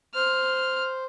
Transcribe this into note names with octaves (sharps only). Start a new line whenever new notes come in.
C5 F6